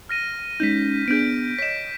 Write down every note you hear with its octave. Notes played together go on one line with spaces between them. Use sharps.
F6 A#6 D#7
G#3 C#4 D#4 G6 B6
B3 D4 G#4 G6 D7
C#5 D#5 B6 E7